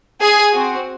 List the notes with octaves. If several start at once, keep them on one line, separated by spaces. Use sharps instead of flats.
G#4 G#5
C4 F#4